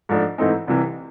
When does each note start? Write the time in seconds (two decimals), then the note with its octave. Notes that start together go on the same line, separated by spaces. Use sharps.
0.09 G#2 F3 A3 D4
0.38 G#2 E3 A3 C4 D#4
0.68 C2 C3 E3